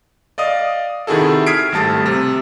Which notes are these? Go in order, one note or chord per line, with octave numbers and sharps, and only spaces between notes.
D5 D#5 F5 D#6
C3 D#3 E4 F#4 G#4 A4
D#6 F6 G#6 B6 C7 D7
G#1 G3 A3 A5 A6
C3